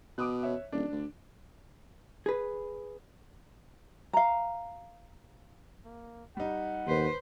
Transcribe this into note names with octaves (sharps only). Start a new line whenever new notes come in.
B2 D6 D#6 F#6
C#5 E5
D#1 D4
D2
G#4 B4
F5 A#5
A#3
G3 D#4 F#5
D#2 B4 C5